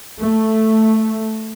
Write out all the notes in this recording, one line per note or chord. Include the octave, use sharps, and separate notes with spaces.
A3